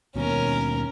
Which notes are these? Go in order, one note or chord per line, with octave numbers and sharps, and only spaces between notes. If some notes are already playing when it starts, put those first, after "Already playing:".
D#2 B2 C#4 A#4